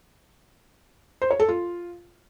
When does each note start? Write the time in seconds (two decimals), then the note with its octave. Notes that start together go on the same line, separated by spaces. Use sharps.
1.22 C5
1.31 C#5
1.40 A4
1.49 F4